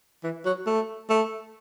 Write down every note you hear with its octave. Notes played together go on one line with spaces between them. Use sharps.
E3
F#3
A3
A3